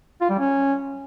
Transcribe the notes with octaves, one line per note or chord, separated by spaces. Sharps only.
F4
G3
C#4